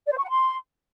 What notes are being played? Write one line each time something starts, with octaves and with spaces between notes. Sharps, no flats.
D5
C5
C#6
F#5
C6